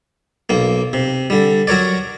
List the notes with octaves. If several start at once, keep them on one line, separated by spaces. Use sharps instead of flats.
B1 A#3
C3
D3 G3
F#3 A#4 C#5 D5